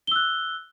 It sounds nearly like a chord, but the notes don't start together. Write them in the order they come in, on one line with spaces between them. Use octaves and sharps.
G7 E6 F#6